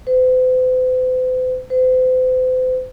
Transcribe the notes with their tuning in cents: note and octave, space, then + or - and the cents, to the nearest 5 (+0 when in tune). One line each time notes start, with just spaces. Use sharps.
C5 -45
C5 -40